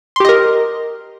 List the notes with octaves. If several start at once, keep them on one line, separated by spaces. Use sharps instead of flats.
G4 A#4 D#5 C6